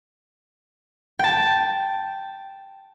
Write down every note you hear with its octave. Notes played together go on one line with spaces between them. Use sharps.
G5 A5